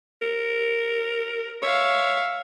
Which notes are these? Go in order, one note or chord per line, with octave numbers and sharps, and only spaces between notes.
A#4
C#5 E5 F5